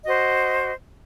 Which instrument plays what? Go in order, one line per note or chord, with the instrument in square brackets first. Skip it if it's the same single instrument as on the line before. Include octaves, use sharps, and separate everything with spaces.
[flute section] F#4 C5 D#5